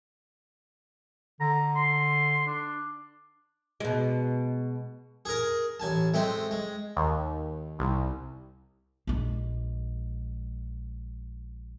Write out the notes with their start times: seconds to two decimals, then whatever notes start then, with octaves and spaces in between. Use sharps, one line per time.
1.40 D3 A#5
1.76 C6
2.47 D4
3.80 B2 G#3
5.25 G#4 A#4
5.80 A1 G#5 A5
6.14 G#3 A3 C4
6.51 G#3
6.97 D#2
7.79 C2
9.07 A#1 G#3